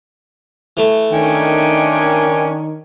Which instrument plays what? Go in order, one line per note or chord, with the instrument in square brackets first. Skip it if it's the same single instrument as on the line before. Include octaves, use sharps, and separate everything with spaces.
[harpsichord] E3 A3
[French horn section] D#3 [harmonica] C#4 G5 G#5 [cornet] D4